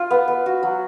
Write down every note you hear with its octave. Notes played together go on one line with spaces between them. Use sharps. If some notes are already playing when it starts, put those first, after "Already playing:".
Already playing: F4
B3
B3
F#4
F#3